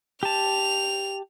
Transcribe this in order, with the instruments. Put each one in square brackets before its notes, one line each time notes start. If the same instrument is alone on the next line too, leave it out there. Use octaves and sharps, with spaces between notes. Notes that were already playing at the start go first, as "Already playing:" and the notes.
[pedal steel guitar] G4 A5 [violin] F7